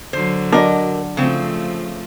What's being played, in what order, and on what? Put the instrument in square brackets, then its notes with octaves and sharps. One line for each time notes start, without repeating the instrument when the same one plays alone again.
[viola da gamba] D3 F#3 [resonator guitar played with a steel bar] C5
[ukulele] D4 F#4 D5 [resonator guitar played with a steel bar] A#4 D#5
[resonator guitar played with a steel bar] C#3 C4 [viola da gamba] F3 A3